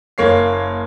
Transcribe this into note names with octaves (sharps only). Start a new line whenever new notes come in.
F#1 A#3 C#5 C7